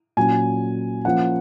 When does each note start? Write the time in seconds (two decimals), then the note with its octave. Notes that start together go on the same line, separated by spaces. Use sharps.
0.17 A#2 F#3 C#4 G#5
1.05 F3 A#3 C#4 F#5